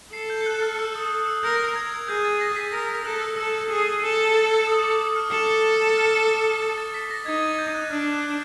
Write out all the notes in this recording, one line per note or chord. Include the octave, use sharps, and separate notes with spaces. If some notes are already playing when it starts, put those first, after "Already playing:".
A4 C7
G6
F#6
F6
E6
D#6
D#6
E6
A#4 G6
G#6
G#4 G6
A6
A#6
B6
A#4 A#6
A4 F#6
E6
A4 E6
G#4
A4
D#6
D6
D#6
F6
A4
F6
A6
A6
B6
A#6
D#4 G#6
A6
G6
F#6
D4 F6
F#6